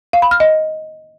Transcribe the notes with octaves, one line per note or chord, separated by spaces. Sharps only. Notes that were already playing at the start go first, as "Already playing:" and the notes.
F5
B5
F6
D#5